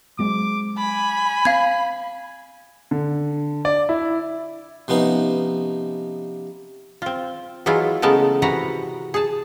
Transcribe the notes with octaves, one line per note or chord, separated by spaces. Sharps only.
F#3 G#3 C4 D6
G#5 B5
C4 F5 G#6
D3
D5
E4
C3 F3 B3 C#4 D#4
C4 F4
E3 F#3 G#3 E4 F4
C#3 G#3 A3 B3 A#4 A5
C3 E3 F#4 B4 F#5 A#5
G#4 A5